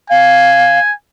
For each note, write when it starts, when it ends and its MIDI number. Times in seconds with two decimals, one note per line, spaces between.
0.10 0.79 77
0.10 0.93 80